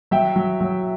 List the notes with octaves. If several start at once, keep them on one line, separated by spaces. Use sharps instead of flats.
F#3 E5 G5
F#3
F#3